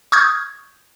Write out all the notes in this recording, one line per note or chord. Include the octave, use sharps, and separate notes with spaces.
C#6 D#6 F6 G6 G#6